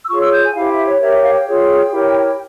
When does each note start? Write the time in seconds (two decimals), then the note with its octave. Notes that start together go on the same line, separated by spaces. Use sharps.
0.03 E6
0.08 F4 G#4 C#5 C#6
0.20 E6
0.31 G6
0.43 G#5
0.54 E4 G4 C5 F5
0.70 E5
0.85 C#5
1.00 G4 A#4 C#5 E5
1.11 E5
1.22 F5
1.34 G5
1.45 F4 G#4 C#5
1.90 E4 G4 A#4 C#5